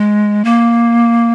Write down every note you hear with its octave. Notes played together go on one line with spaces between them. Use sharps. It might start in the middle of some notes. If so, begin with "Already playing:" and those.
Already playing: G#3
A#3